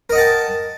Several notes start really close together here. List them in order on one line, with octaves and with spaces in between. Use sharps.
A#4 D#5 F#5 A5 G5